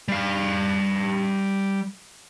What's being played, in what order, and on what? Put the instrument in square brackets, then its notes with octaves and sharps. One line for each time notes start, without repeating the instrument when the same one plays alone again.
[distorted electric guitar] G3 F5